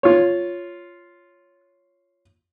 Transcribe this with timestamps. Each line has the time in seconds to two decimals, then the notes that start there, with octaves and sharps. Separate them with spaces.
0.03 F4 C#5